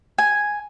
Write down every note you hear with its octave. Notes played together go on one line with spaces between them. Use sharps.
G#5